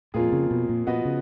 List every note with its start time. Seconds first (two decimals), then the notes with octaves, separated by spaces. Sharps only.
0.14 F2 A#2 F3 A#3 F4 G#4
0.32 C#3
0.51 B2
0.69 A#2
0.87 A#2 F3 B3 F#4 B4 D#5
1.05 C#3